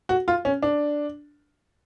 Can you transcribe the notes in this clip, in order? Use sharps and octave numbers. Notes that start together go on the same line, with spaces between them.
F#4
F4
C#4
D4